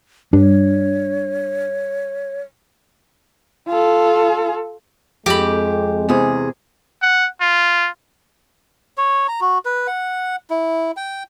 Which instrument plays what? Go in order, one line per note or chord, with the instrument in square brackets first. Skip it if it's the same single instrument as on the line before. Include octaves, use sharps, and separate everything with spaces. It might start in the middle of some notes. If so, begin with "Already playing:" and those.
[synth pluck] G2 [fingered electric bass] G3 [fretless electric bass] D4 [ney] C#5
[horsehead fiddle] F4 A4
[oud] F2 [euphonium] G#3 [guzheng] G4 B5
[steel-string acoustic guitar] E2 C3 G#4
[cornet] F#5
F4
[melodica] C#5
A#5
F#4
B4
F#5
E4
G5